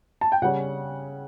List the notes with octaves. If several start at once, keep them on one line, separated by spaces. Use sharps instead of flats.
A5
G5
C#3 G3 C#4 F#5